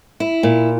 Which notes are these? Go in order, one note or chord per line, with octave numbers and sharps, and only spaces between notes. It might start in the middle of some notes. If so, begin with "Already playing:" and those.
E4
A#2